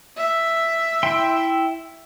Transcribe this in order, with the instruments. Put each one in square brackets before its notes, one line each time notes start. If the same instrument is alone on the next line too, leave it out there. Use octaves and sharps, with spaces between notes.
[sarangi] E5
[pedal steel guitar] E4 G5 C6